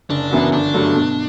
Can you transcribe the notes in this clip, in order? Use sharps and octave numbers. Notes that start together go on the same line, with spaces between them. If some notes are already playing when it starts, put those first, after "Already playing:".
F#1 D4
F#2 E3 B3 F#4
G1 D4
G2 F#3 A3
B2